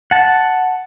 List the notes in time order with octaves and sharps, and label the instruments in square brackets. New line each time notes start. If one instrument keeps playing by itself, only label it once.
[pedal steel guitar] F#5 A5